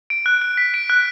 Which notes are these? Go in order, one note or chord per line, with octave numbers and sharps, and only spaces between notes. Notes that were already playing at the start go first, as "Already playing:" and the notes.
D7
F#6
F#6
B6
D7
F#6